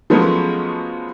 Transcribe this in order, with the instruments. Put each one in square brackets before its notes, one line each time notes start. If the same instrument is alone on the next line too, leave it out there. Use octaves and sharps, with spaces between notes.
[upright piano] F3 F#3 G#3 A3 B3 C#4